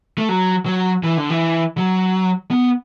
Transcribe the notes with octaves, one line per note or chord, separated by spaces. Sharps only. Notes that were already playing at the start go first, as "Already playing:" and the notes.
A3
F#3
F#3
E3
D3
E3
F#3
B3